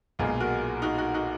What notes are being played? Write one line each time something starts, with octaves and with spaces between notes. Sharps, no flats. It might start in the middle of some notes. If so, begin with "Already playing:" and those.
B1 A#2 G#3 F4 G#4
F#4 A#4
D#4 F#4
D#4 F#4
D#4 F#4